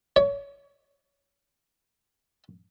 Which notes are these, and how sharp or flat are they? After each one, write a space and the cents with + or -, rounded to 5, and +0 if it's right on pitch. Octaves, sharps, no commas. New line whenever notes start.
C#5 +25